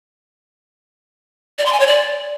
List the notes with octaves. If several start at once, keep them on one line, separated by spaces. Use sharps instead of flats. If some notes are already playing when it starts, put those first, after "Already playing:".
D5
C6
G#5
C#5
D5